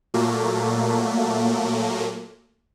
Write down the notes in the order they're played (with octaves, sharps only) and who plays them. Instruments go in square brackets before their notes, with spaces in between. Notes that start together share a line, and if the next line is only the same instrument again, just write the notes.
[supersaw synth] A#2 F#3 A3 A#3